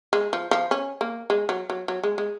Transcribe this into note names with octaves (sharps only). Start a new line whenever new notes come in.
G#3
F3
F3
C#4
A#3
G#3
F#3
F#3
F#3
G#3
G#3